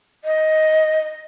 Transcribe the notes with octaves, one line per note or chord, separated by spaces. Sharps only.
D#5